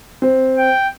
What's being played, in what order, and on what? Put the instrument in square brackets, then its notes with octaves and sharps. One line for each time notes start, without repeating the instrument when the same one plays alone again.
[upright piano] C4
[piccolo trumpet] G5